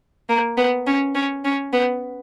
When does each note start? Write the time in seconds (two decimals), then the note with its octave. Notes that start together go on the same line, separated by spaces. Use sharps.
0.29 A#3
0.57 B3
0.87 C#4
1.15 C#4
1.45 C#4
1.73 B3